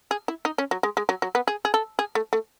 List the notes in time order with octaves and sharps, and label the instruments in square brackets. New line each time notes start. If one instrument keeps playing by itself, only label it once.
[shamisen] G#4
E4
D#4
C#4
F#3
G#3
G#3
F#3
F#3
B3
G#4
G#4
A4
G#4
A3
A3